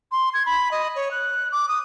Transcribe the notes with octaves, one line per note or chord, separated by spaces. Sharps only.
C6
G#6
B5
D#5
C#5
F#6
D6
D#6